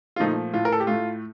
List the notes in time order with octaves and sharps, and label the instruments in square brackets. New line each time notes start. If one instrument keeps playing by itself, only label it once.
[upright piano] F4
A#2 F3 A3 D#4
A2 A3 F4
A#4
A4
G4
A2 A3 F4